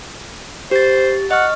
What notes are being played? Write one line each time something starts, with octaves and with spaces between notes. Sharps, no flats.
G4 C5 A6
D#5 F#5 C#6 F6